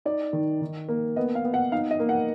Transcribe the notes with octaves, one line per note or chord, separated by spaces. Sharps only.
D#4 D5
D#3
D#3
A#3
B3 D#5
F5
B3
F#5
D#4 F5
D#5
A#3
F#5